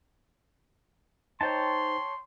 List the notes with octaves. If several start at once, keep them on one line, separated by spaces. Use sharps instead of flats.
D#4 C5 C#5 G5 A5 C6